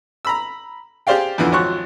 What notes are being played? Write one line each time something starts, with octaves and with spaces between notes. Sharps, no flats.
A#5 B5 E6
G4 G#4 C5 D5 F5 G5
F2 D3 E3
G#1 F3 F#3 C#6 F#6